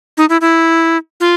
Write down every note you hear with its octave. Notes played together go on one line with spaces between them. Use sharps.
D#4
E4
E4
F4